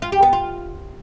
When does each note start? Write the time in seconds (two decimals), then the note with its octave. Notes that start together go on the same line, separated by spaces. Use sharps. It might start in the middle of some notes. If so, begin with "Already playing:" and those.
0.02 F4
0.12 G4
0.23 B3
0.33 F4